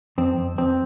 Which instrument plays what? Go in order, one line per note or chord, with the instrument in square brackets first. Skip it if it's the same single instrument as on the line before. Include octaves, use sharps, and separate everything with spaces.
[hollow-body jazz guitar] F2 C4
F2
F2 C4